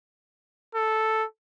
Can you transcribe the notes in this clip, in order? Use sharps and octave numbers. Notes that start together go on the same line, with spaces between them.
A4